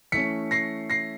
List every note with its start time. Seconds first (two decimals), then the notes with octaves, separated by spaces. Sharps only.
0.12 E3 A3 C#4 B6 C#7
0.51 A#6 C7
0.90 A#6 C7